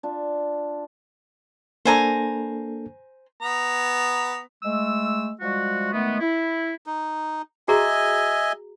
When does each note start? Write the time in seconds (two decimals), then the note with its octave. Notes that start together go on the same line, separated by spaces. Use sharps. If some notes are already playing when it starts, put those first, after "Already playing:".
0.03 D4 F4
1.85 A#3 D4 A4 C5 G#5 A#5
3.42 B3 A#5
4.63 G#3 A3 E6
5.40 F3 G3 G#3 F#4
5.93 D#3 G#3 A3 B3
6.20 E4
6.86 D#4
7.68 F#4 G#4 D#5 E5 G#5 A#5